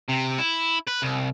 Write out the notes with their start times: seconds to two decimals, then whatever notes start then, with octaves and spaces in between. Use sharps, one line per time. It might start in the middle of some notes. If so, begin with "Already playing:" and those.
0.08 C3
0.39 E4
0.88 B4
1.03 C2